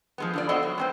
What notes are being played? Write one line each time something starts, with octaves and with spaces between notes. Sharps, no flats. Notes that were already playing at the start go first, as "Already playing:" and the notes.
F3 G#3 B3
D3 F4 D5
B3 F#4 A4 C5 D#5 F5
F#3
G#3 C4 C5